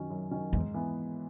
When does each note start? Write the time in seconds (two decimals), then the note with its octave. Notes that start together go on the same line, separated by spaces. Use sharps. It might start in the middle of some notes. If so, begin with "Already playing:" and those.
Already playing: F#2 D#3 F#3 C#4
0.10 F#2
0.31 D#3 F#3 C#4
0.53 E2 G#2
0.74 E3 B3